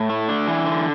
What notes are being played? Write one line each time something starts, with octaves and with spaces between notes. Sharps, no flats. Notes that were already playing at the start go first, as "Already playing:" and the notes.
Already playing: A2 F#5
A3
D4
E3
D3